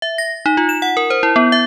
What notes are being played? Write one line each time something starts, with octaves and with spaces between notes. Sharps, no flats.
E5
A#6
D#4
F4
E7
F#5
A#4
C5
E4
B3
E5